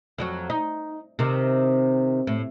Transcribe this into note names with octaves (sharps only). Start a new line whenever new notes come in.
F2 F#3 F#4
D#4
C3 D#3
A2